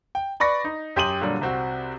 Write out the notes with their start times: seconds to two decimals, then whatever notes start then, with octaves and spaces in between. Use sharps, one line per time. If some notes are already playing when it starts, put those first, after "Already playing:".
0.15 G5
0.40 B4 D5 B5 C#6 A#6
0.64 D#4
0.96 F#2 G4 C6 D#6 D#7 F#7
1.21 A#2 D3 F#3 G3
1.41 C2 C4 F#4